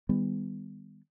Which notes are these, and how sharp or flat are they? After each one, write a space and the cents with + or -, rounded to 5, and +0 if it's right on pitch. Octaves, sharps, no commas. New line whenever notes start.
D#3 +0 G3 +30 B3 +15